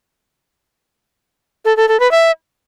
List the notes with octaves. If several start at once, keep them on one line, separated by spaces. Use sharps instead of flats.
A4
A4
A4
B4
E5